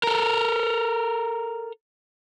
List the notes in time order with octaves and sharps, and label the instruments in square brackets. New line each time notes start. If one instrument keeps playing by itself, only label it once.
[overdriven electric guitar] A4 A#4